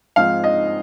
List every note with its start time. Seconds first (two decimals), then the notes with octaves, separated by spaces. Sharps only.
0.16 G#2 F3 C4 D#4 F5
0.44 D#5